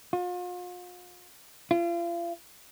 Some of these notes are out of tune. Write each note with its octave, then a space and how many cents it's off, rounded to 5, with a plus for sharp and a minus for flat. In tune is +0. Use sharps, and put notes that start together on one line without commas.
F4 +40
F4 -35